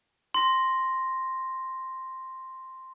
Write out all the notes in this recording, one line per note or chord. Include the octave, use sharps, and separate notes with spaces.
C6 A#6